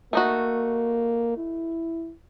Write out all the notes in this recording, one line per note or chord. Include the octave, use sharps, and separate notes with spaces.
A3 A#3 D#4 F#4
E4